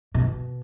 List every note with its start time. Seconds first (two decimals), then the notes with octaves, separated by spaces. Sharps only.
0.14 B2